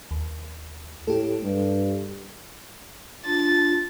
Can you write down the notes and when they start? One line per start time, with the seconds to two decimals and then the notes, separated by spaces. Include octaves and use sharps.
0.11 D#2
1.07 A2 G4 A4
1.43 G2
3.25 D4 F4 A6